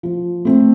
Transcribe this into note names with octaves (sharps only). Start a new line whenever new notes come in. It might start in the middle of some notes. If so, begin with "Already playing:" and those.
F3
A3 C4